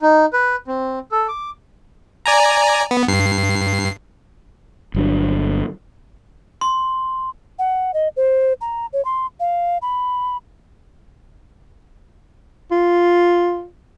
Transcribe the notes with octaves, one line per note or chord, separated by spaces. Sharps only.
D#4
B4
C4
A4
D6
D5 G#5 A#5
B3
G2 C7
G1 F#3 D4
C6
F#5
D#5
C5
A#5
C#5
C6
F5
B5
F4